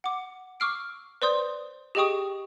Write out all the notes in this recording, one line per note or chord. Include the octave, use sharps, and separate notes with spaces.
F#5 D6
C#6 D6 E6 F6 C7 D7
B4 C5 D5 C6 D#6 G6
G4 G#4 D#5 G5 C#6 D#6